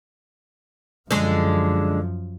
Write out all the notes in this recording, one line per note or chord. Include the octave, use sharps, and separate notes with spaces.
F#2 D3 F3 G#3